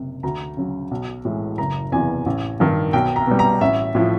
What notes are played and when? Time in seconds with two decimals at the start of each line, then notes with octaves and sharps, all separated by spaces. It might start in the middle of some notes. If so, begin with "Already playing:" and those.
Already playing: F#1 C3
0.23 D2 A#5
0.57 C#3 F#3
0.91 B1
1.25 A2 E3 G#3
1.58 F#1 A#5
1.92 E2 C3 E3 G#5
2.26 A1
2.60 G2 D#3
2.93 B1 G5
3.16 A#5
3.27 B2 G3
3.39 A#5
3.61 A1 E5
3.95 A2 F3